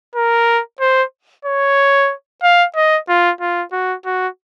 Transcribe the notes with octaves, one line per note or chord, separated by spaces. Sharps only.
A#4
C5
C#5
F5
D#5
F4
F4
F#4
F#4